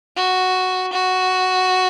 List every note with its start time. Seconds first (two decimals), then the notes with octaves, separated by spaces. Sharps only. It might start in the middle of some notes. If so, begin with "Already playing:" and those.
0.17 F#4
0.93 F#4